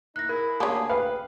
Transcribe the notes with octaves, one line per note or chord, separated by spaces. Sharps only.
A#3 D#4 E4 F#6 A#6
E4 G#4 A#4
D2 C#3 A#3 G#4 G#5 A5 D#6
B4 F5 G5